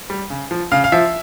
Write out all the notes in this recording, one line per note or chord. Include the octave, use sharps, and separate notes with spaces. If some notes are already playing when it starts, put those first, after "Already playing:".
G3
C#3
F3
C#3 F5
F5
F3 E5